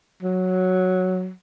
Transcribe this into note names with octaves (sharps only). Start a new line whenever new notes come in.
F#3